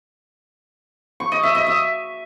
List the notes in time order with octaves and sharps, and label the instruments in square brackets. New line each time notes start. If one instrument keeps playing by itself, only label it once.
[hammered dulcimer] C#6
D#5
E5
D#5
E5